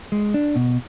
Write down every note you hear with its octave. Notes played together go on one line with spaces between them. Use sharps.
G#3
D4
B2